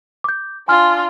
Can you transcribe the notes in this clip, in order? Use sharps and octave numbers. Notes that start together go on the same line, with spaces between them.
D6 G6
D4 F4 G#5 C6 F6